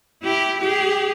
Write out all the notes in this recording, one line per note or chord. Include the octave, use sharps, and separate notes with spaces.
E4 G4
G4 G#4